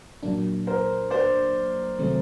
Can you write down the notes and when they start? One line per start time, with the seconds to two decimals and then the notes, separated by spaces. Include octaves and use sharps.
0.23 A#2 F#3 A#3 D4
0.67 A#4 C5
1.10 C5 D5
1.99 C3 D#3 F#3 A3 C4